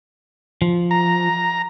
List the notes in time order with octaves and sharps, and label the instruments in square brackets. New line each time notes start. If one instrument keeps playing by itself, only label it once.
[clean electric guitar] F3
[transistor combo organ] A#5